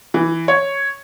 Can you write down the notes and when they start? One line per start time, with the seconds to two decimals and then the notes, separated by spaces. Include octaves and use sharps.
0.14 E3
0.48 C#5